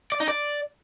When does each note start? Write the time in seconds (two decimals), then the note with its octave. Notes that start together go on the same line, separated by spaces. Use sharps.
0.12 D5
0.20 D#4
0.28 D5